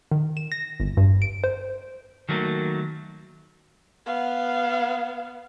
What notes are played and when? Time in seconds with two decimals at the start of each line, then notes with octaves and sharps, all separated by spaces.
0.11 D#3
0.37 E7
0.52 A#6
0.80 G1
0.97 G2
1.22 D7
1.44 C5
2.29 D#3 F#3 A3 A#3
4.06 B3 F5